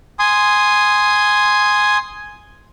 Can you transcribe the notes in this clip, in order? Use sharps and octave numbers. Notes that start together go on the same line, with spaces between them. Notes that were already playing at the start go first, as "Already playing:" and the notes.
G#5 C6 D#6